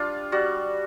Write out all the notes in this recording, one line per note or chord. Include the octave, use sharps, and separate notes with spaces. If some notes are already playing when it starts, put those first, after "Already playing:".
Already playing: G3 D4 F4
G3 F#4